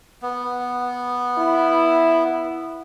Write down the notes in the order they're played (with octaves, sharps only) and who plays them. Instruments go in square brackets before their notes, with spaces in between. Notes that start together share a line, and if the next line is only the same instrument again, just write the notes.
[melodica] B3
[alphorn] E4